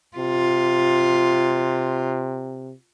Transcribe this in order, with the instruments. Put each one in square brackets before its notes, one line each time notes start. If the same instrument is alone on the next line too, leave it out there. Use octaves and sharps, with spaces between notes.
[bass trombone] C3 [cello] F4